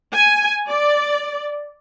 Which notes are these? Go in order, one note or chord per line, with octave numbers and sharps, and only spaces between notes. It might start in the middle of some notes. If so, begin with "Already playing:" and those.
G#5
D5